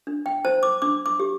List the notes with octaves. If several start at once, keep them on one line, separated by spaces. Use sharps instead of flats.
D4
G5
C5 A5
D6
D4 D6
D6
G4